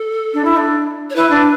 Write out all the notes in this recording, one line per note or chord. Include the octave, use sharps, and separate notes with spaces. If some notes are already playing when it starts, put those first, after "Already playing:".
Already playing: A4
D4
E4
D4
C#5
E4 B4
D4